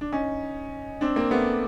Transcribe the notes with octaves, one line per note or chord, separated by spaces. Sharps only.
D4
C#4 D#4
C4 D4
A#3 C4
A3 B3